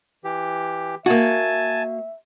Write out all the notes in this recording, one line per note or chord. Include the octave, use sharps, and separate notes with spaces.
E3 G4
A#3 F#4 E5 G#5 A5